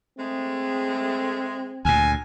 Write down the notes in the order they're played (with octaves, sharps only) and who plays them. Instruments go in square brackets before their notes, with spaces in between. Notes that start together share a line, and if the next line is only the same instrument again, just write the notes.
[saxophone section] G#3 A3 [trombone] C4
[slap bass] D2 A#2 [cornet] G#5